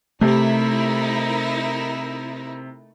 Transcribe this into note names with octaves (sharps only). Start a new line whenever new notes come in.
C3 A3 D#4 E4 A#4